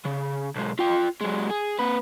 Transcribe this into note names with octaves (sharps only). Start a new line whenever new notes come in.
C#3
B1 G#3
F4 G5
F#3 G#3
G#4
A#3 B4